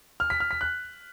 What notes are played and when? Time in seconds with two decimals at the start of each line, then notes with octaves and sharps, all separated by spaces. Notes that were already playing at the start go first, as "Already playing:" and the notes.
0.20 F6
0.30 B6
0.40 F6
0.51 B6
0.61 F#6